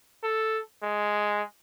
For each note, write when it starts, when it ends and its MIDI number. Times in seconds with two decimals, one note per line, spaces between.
0.24 0.60 69
0.83 1.43 56